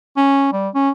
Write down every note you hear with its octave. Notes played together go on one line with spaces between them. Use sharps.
C#4
G3
C#4